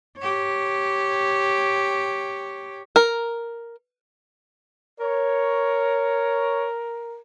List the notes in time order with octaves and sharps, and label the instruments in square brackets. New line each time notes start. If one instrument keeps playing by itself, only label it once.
[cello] G4 C#5
[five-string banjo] A#4
[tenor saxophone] A#4 [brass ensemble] C#5